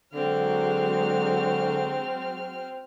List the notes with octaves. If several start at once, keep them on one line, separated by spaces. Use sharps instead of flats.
D3 F#3 G#3 C4 F#4 F6